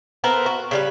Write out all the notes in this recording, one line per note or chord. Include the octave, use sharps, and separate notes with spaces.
B3 C4 A4 A#4
F#4
C#3 G3 B4